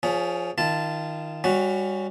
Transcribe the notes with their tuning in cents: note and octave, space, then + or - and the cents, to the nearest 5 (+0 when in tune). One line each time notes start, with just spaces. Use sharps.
F3 +0 C#4 +30 G#4 +0
D#3 +0 F4 -25 A5 +0
G3 +25 C#4 +0 F#4 +0